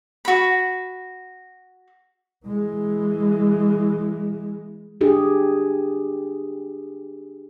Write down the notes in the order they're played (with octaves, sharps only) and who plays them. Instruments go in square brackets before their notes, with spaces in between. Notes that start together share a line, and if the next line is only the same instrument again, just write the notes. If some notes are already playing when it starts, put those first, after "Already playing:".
[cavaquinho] F#4 B5
[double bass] E3 G#3
[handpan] D4 G4 G#4